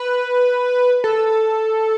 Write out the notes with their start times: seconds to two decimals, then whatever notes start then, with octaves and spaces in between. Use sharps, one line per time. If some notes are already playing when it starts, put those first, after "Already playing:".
Already playing: B4
1.04 A4